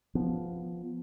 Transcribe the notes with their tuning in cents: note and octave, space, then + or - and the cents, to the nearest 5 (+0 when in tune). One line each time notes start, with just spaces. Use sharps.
F3 +0 B3 +0